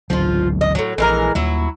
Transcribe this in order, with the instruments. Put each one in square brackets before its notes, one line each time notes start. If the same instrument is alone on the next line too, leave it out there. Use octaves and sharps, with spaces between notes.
[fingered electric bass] G#1 D2 F#3 [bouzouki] F3 F4
[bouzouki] D#5
A2 F#3
[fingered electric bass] A#1 [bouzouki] E3 G#3 A#4
[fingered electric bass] D#2 G3 [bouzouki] F#3 E4